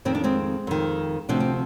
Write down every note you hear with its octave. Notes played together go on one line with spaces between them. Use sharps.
F2 D#3 C4
D4
G#3 C4
F2 D#3
D2 C3 F3 D4
C4